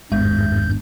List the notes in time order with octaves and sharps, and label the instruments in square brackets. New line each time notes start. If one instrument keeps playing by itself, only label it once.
[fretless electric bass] G#1 [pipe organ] E2 G2 G6 [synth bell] G#3